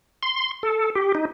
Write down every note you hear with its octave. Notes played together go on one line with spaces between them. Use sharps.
C6
A4
G4
D#4